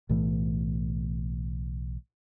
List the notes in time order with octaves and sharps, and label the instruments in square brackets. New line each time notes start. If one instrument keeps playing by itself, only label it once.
[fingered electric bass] B1 A2 E3 A3